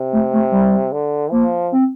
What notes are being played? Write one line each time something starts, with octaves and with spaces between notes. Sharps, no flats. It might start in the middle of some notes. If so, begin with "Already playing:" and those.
Already playing: C3
A3
A3
G3
D3
F3 A#3
C4